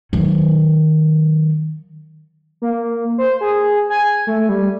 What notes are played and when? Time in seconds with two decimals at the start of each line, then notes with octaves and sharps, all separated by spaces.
0.13 D#3 F#3
2.62 A#3
3.18 C5
3.41 G#4
3.90 G#5
4.27 A3
4.49 G3